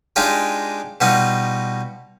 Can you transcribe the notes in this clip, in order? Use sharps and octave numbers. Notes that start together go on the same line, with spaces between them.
G#3 D4 D#4 F4 G4
B2 G3 D#4 F4